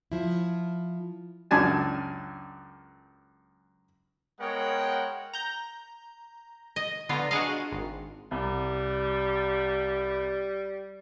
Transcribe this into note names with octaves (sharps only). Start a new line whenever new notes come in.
F3 E4
C#2 F#2 D4 G#5 A5
G#3 B3 A#4 C#5 F#5 G5
A#5 G6
D#5
D3 B3 D4 F4 A#5
D4 F#4 G#4 D#5 F5
G#1
C2 G3